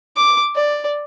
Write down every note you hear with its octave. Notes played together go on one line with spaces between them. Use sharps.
D6
D5